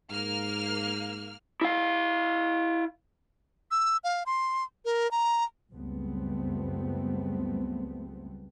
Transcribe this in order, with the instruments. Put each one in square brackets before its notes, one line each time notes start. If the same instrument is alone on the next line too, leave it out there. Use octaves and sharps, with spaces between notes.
[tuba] G#2 [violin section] A#3 F6
[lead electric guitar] E4 F5
[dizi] E6
F5
C6
A#4
A#5
[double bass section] C#2 F#2 G3 A3 B3 C4